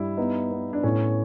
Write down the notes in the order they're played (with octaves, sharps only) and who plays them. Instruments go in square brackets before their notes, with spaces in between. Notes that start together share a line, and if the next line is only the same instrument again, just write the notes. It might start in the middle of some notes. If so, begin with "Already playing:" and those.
Already playing: [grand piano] G2 G3 [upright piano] E4
[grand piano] B3 [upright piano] D#4
[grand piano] B3
[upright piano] D4
[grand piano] A2 [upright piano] C#4